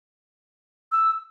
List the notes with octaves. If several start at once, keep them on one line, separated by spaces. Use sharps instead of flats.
E6